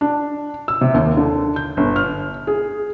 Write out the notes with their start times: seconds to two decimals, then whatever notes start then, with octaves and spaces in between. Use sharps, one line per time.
0.01 D4
0.68 E6
0.81 C3
0.94 D#2
1.17 D3
1.56 G6
1.77 G1
1.96 F6
2.47 G#4